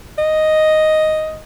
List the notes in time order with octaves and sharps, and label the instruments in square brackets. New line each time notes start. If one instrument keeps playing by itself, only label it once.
[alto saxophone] D#5